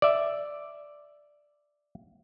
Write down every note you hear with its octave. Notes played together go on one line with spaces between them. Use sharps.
D5 E5